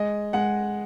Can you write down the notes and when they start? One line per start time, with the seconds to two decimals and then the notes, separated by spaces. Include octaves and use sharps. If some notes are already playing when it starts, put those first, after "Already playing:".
Already playing: G#3 D#5
0.33 G#3 F#5